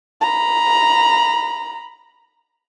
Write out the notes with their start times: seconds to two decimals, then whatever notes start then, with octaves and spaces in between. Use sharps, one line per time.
0.21 A#5 B5